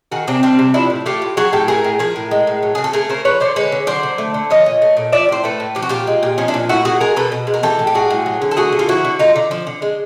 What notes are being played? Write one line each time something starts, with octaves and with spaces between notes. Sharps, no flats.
D#3 F#4 G#4
C3 C4 D4
G3 C4 D4
C3
F3 D4 E4
A2
A3 F4 G4
A2
F#3 F#4 G#4
A2 G4 A4
A3 G#4 A#4
A2
F3 G#4 A#4
A2
G#3
A2
F#3
C#3 G#4
A4
A3 G#4 A#4
C#3 A#4 C5
F3 B4 C#5
D3 C5 D5
G#3 B4 C#5
D3
F#3 C5 D5
D3
A3
D3
F3 C#5 D#5
A#2
A3
A#2
F3 D5 E5
A2 C5
A3 A4 B4
A2
F3 G4
F#4
A#2 F4 G4
G#3
A#2
F3 C#4 D#4
D4 E4
A#2
A3 E4 F#4
A#2 F#4 G#4
G#3 G#4 A#4
B2 A4 B4
B2
G#3
A#4
E3 G4 A4
A2
G4
G3 F#4 G#4
A2
F#3
D3
A4
A3 F#4 G#4
D3
F4
F3 E4 F#4
D3
A3 D#4 F4
D3
F3
D3
G#3